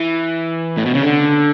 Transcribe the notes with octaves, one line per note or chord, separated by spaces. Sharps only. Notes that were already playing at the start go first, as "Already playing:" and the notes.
Already playing: E3
A2
B2
C#3
D3